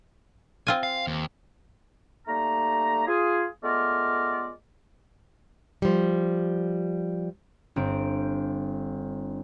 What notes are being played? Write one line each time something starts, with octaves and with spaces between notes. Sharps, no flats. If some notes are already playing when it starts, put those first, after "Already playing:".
C4 F4 G#5
F5
D#2
G3 A3 A#3 D#4 A#5
F4 G#4
G#3 A3 B3 F4 A#4 D5
F3 G3
G1 C4 D7